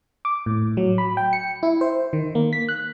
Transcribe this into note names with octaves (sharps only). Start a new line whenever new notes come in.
D6
A2
F#3
B5
G5
C#7
E4
C5
D#3
A#3
B6
F#6